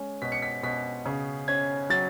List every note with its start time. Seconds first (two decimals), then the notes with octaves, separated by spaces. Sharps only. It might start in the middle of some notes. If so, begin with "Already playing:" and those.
Already playing: G#3 C#4
0.22 B2 B6
0.32 C#7
0.42 B6
0.63 B2 B6
1.06 C#3
1.48 C#4 G#6
1.90 F#3 A6